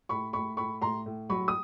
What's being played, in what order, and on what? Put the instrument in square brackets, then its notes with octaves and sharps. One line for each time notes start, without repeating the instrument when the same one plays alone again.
[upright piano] A2 B5 C#6
A2 B5 C#6
A2 B5 C#6
A2 A#5 C6
A2
F#3 B5 C#6
D#6